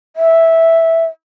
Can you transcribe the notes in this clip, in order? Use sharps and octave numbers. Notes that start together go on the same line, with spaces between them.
E5